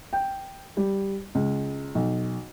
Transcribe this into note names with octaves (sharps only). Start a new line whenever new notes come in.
G5
G3
C#2
B1